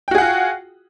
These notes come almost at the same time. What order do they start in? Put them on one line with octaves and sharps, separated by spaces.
G5 F#4 G#4 F#5 F4